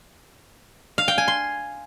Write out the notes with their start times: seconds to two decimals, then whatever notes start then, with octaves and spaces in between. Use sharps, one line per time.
0.98 F5
1.08 G5
1.18 G#5
1.28 C6